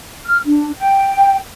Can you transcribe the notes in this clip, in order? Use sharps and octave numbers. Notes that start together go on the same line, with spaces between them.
F6
D4
G5